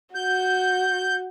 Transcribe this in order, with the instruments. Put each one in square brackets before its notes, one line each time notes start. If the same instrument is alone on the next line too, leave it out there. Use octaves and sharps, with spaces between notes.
[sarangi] F#4 [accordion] G6